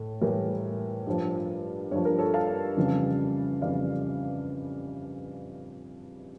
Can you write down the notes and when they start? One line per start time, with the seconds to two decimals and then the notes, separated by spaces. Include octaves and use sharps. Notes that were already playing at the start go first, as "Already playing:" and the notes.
Already playing: A2 A4
0.21 A2 E3 G3 G4 A#4
1.06 G2 F3
1.91 G2 F3 C#5
2.05 A#4
2.19 A4 C#5
2.34 F5 A5
2.77 F2 C#3 E3 G3
3.61 F2 C#3 E3 G3 D5 F5